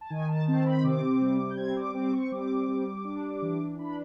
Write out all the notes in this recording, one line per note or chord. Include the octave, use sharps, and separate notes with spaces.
A5
D#3 G#5
A5
C4 A5
B5
C3 D6
G3
G6
C4 G#6
D6
C4 D6
C#6
G3 D6
G3
D4
E3
D4 B5